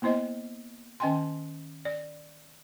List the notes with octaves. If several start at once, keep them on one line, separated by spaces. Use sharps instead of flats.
A#3 B3 E4 C5 D#5
D#3 C#4 D#5 G5 G#5 C6
D5